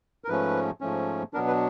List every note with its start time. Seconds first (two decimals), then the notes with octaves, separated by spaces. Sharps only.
0.24 A#4
0.28 G#2 F3 A3 C#4 B4
0.81 G#2 F3 A3 C#4
1.33 B2 F#3 B3 D4 A#4
1.47 B4